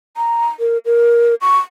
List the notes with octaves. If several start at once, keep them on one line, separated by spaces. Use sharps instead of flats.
A#5
A#4
A#4
C#6